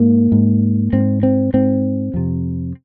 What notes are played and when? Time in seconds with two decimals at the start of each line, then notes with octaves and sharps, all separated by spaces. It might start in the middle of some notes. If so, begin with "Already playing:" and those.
Already playing: G#2 A#3
0.32 G#2
0.93 G#2 C4
1.23 C4
1.54 G#2 C4
2.14 F2 C3